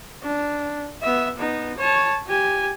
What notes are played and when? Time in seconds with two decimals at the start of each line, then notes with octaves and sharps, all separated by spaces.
0.23 D4
1.02 B3 E5
1.37 B3 D#4
1.78 C#5 A5
2.28 G4 G#5